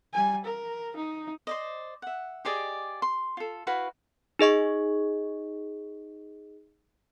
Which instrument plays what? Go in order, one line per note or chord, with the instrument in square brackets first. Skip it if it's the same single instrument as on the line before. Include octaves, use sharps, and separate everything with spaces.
[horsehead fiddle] G3 G#5
A#4
D#4
[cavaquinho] C5 D5 D#5
E5 F#5
G4 G#4 D5 D#5
C6
F4 A4
E4 F#4 B4 F5
[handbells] D#4 G#4 D#5 C#6